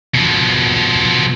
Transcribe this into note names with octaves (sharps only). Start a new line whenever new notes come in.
B2 F3